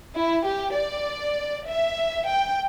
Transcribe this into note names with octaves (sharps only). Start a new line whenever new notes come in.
E4
G4
D5
E5
G5